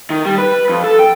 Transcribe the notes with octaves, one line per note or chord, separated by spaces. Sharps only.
D#3
G3
B4
F2
A4
G5